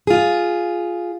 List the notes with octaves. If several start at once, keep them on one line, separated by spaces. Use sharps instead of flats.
F4 G#4